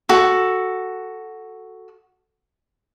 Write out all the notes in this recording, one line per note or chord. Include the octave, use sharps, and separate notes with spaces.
F#4 A4